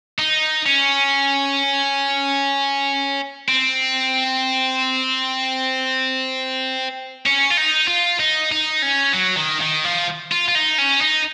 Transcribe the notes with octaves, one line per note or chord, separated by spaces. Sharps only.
D#4
C#4
C4
C#4
F4
D#4
F4
D#4
D#4
C#4
F#3
D#3
D#3
F3
F4
F4
D#4
C#4
D#4